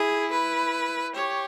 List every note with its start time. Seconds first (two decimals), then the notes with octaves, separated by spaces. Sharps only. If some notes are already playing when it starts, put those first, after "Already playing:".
Already playing: E4 G#4
0.32 B4
1.15 G4 C#5